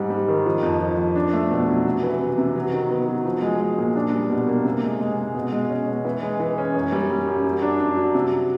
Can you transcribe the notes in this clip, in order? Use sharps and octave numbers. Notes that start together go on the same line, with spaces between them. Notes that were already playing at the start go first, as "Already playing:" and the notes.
Already playing: G#2 G3
G3
D#3
F3
F2
F3
F3
D4
A3
B2
F#3
C3
E3
C3
C3
F#3
D#3
B3
F#3
F3
G#3
G#3
A#2
D4
G3
B2
A#3
C3
G#3
G#3
G#3
B2
G#3
C#4
B2
E3
G#3
E3
C#4
F#2
G3
G3
F#2
F#3
D4
D4
F#3
C3